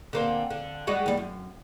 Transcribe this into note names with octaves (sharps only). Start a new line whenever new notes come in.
D3 A#3 C4
D3
G3 G#3 F#4
D#2 G3
F#2